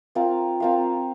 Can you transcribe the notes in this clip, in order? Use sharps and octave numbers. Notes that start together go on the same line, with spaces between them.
C4 F4 A#4 F5
C4 F4 A#4 F5